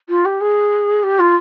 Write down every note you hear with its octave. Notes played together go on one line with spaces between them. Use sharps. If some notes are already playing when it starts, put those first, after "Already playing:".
F4
G4
G#4
G4
F4